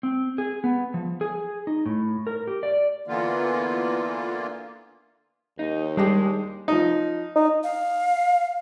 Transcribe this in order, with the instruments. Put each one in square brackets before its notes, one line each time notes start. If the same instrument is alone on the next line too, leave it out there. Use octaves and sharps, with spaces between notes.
[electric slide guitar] C4
G#4
B3
F3
G#4
D#4
A2
A#4
G4
D5
[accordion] D3 E3 A#3 B3 F4
[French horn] D#2 [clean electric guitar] D#4
[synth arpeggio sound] G3 [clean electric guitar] G#3 [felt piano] D4 D#4 G4
[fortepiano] F3 D#4
[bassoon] D#4
[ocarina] F5